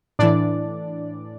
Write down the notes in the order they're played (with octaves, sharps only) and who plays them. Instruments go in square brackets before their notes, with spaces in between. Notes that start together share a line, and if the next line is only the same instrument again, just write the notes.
[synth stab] A2 E3 D4 D5